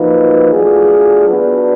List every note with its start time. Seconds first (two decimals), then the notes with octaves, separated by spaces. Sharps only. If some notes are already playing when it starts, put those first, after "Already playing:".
Already playing: F3 A#3 D#4 F#4 B4
0.52 F#3 A3 D4 F4 G#4
1.27 F#3 B3 D4 F#4 B4